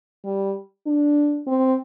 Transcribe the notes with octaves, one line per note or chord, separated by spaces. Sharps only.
G3
D4
C4